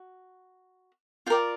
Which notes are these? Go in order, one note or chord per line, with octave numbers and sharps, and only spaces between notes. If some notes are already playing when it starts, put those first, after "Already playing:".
Already playing: F#4
F4 A#4 D5 G5